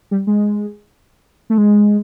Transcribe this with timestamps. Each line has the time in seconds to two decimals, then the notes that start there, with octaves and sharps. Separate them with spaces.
0.11 G3
0.27 G#3
1.50 A3
1.58 G#3